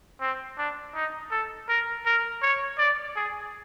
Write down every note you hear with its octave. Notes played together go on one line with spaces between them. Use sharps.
C4
D4
D#4
A4
A#4
A#4
C#5
D5
G#4